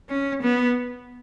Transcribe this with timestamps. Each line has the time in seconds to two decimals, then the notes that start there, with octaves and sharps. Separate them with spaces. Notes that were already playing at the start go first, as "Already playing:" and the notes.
0.09 C#4
0.43 B3